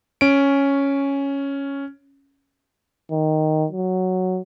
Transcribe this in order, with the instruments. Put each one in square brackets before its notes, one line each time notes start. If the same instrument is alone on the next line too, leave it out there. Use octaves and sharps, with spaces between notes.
[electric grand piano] C#4 D7
[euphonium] D#3
F#3